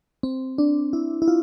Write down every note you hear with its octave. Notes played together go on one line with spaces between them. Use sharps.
C4
D4
E4
E4
F4